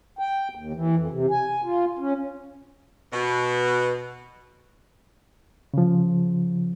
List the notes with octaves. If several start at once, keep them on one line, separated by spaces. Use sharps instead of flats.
G5
D#2
E3
F2
C3
G#5
F4
C#4
B2
C#3 F3